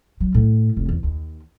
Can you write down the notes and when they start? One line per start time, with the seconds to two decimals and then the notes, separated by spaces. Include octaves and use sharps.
0.20 F#3
0.34 A2
0.77 F1
0.89 E2
1.04 D#2